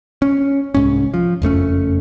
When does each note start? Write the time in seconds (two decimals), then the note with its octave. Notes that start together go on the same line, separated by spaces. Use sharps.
0.22 C#4
0.74 C2 G#2 C#4
1.14 F3
1.42 F#1 F2 A3 C#4